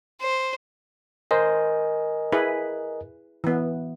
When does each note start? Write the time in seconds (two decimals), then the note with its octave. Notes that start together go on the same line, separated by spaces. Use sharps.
0.21 C5
1.31 A#4 C5 D#5 G#5
2.32 E4 G#4 B4
3.44 E3 B3